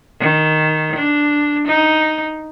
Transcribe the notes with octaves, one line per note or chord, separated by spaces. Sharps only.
D#3
D4
D#4